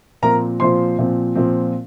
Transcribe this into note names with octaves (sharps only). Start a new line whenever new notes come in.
A#2 F3 C4 A#4 A#5
A#2 F3 C4 C5 C6
A#2 F3 C4
A#2 F3 C4